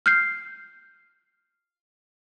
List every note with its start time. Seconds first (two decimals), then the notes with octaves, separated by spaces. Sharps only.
0.06 F6 G6 C7